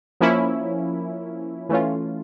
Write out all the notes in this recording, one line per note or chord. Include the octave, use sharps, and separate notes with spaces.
F3 A#3 C#4 E4
E3 A3 C#4 F4